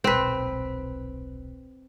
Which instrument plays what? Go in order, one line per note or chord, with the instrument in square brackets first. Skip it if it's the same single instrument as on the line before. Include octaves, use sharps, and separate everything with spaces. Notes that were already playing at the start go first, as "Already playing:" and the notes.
[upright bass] D#1 B1 [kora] C4 B4